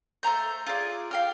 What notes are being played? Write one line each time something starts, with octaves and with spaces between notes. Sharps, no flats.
A3 C5 A#5 G6
F4 G#4 D5
F5 G5 F6